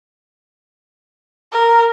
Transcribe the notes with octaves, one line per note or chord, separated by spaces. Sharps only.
A#4